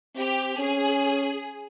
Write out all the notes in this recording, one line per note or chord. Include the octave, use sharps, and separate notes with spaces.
C4 G4
C#4 G#4